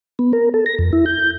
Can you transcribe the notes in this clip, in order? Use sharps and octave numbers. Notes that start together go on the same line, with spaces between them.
B3
A#4
A4
A#6
F2
E4
G6